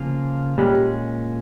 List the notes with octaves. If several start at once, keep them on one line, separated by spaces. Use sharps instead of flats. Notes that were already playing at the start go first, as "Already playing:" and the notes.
Already playing: C#3 F3 A#3 F4 G#4
A#2 G3 G#3 C#4